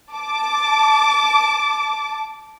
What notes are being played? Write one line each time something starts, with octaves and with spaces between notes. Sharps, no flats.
A5 D6